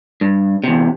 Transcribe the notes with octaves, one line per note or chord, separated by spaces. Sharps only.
G2
E2 C3